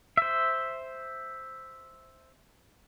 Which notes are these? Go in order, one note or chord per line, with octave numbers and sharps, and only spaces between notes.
C5 E5